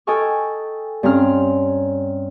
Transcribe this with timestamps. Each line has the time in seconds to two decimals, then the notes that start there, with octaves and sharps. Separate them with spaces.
0.07 A4 D#5 G5 G#5 C#6 F6
1.03 G2 C4 C#4 A#5 F6